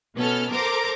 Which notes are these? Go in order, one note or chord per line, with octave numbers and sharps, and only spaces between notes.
B2 B3 C#4 A4 F6
A4 A#4 C5 A#5 D6